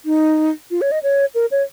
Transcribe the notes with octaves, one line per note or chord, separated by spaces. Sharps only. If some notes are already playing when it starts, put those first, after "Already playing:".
D#4
F4
C#5
D#5
C#5
A#4
C#5